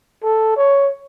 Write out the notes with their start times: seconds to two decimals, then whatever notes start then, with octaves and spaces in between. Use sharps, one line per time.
0.23 A4
0.56 C#5